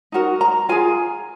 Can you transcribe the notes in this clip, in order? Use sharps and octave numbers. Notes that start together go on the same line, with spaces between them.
D#4 F#4 A#4
A#5
F4 G#4 G#5